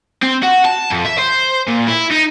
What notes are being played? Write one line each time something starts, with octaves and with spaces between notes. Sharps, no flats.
C4
F#4
A5
F2
E5
C5
A#2
E4
D#4